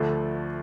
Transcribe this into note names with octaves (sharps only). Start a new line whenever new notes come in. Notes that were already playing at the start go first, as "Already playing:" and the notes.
Already playing: D2 D3 F3 A3